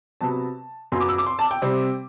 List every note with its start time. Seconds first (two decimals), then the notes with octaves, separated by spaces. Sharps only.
0.21 C3 F#3 B3 A5
0.92 F#2 F#3 B3 C6
1.00 D6
1.09 E6
1.18 D6
1.26 C6
1.39 A5
1.51 G5
1.62 C3 G3 C4